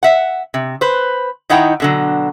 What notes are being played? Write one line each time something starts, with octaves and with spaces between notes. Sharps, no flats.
E5 F#5
C3
B4 C5
D#3 D#4 E4 F#5 G5 A#5
B2 D3 F#3